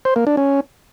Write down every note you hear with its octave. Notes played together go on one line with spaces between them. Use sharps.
C5
A#3
D4
C#4